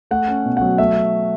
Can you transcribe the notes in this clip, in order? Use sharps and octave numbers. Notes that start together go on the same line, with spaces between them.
A3 F#5
C#4
B2
F#3 F#5
A3 E5